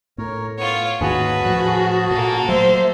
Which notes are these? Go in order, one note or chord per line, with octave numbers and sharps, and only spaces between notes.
A2 A#4 C#5
B3 F4 C#5
D#2 G#2 C#4 F#4 G#4 B4 A5
A2 F3
A#2 A#3 A4
F#3 A3 C5 E5